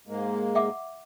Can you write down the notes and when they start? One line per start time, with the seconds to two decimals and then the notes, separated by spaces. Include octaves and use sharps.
0.07 G#2 G#3 A#3
0.55 E5 F#5 D6